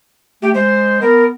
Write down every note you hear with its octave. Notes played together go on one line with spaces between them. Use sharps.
A3 G4
G#3 C5
B3 A#4